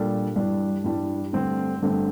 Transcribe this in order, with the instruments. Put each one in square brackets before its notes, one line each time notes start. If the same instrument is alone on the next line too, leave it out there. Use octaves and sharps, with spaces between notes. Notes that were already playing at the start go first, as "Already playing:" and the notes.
Already playing: [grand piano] A#2 G3 D4 A4
G2 E3 G3 D4
G2 E3 G3 D4
G2 D3 A3 C4
G2 D3 A3 C4